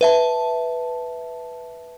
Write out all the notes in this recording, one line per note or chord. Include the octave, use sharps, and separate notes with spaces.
B4 E5 A5